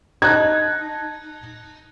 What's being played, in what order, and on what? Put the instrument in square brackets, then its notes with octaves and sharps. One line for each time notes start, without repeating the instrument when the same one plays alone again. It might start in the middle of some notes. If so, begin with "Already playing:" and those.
[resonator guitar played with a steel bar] D#4 [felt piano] A5 F#6 G#6